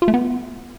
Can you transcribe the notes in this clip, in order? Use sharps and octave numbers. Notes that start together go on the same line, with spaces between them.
F4
A3
B3